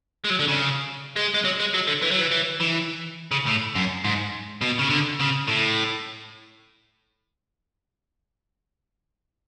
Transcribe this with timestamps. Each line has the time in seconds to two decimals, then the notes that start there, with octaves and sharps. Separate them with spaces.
0.25 G#3
0.30 F#3
0.39 D3
0.48 C#3
1.16 G#3
1.34 G#3
1.45 F#3
1.60 G#3
1.74 F#3
1.87 D3
2.02 E3
2.11 F#3
2.21 E3
2.31 E3
2.60 E3
3.31 C#3
3.46 A2
3.75 F#2
4.04 G#2
4.61 B2
4.79 C#3
4.90 D3
5.20 C#3
5.47 A2